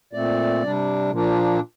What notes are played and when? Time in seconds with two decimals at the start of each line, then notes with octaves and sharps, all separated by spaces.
0.13 A#2 A3 C4 D5
0.63 C3 G3 D4
1.11 A#2 F3 A#3 D4